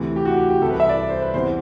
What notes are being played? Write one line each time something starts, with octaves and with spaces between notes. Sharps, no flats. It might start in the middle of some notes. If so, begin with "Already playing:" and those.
Already playing: D2 C3 E3
G4
F#4
G4
G4
C2 C3 E3 A4
B4
E5
D5
C5
B4
E2 C3 E3 C5